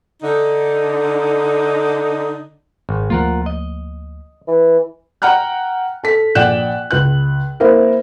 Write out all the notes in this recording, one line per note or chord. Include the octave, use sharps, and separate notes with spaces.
D3 D#4
G#1
D2 F3 A#3 F4 A#4 F#5
D#5
E3
F#5 G5 A#5 F6 F#6
A4 B6
A#1 D5 F#5 G5 F#6 E7
C#2 F#6
A#3 C4 E4 A#4